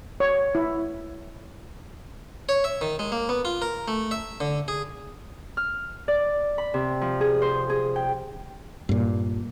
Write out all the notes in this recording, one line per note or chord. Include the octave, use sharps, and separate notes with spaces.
C#5
E4
C#5
E5
D#3
G#3
A#3
B3
F4
A#4
A3
E5
D3
G#4
F6
D5
B5
C3
F3
G#4
C5
G#4
G5
G2 A#2